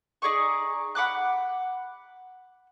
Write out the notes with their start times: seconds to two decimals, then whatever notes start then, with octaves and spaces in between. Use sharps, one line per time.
0.22 D#4 G#4 D5 C#6
0.95 F#5 B5 D6 F#6